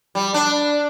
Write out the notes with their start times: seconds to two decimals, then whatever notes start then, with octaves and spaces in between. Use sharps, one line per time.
0.15 G3
0.34 D4